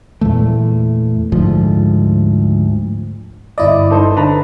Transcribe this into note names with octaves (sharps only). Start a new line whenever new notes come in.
E2 A#2 E3 A3
D2 G#2 F3
G1 E4 D5 D#5
D#4 A4 C5
D3 B4 A5 A#5